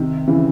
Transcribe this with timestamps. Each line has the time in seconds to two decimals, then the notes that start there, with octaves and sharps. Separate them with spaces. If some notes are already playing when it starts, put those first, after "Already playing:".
Already playing: C3 D#3
0.27 C#3 E3